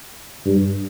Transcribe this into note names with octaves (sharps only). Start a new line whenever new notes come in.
G2